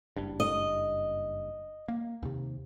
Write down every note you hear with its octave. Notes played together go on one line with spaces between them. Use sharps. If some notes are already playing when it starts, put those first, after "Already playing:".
F#1 G2
D#5
A#3
D#2 C3